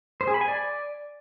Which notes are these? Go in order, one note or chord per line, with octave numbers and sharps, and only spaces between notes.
C5
G#4
B5
G#5
D5